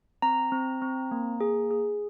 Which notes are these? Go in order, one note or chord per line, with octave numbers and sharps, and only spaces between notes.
C4 A#5
C4
C4
A#3
G#4
G#4